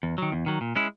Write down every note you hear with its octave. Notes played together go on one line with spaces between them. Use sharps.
E2
D#3 F#3
E2
D#3 F#3
A#2
G#3 C#4 E4